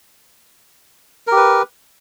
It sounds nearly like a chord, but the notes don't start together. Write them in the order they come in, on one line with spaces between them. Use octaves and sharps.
A#4 G4 B4